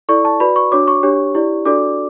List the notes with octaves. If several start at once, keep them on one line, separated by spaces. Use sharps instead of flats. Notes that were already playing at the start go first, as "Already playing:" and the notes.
E4 A4 D5 C#6
A5
F#4 B4 D5 B5
C#6
D4 F#4 C#5 D6
C#6
D4 G4 C#5
E4 G4 D5
D4 F#4 A4 D5 D6